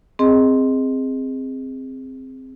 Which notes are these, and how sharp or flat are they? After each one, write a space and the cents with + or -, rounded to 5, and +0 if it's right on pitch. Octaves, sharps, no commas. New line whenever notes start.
C4 +0 G#4 -10 D#5 +0